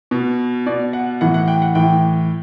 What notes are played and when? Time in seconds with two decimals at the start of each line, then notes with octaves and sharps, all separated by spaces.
0.11 B2
0.66 B2 D5
0.93 F#5
1.21 A2 E3 F#5
1.34 F#5
1.48 G5
1.62 F#5
1.75 A2 E3 G5